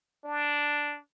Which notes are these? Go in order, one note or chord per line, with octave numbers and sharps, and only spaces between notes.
D4